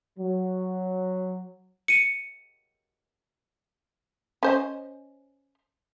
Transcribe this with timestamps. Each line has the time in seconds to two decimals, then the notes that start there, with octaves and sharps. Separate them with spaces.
0.18 F#3
1.88 C#7 D#7
4.43 C#4 C5 D#5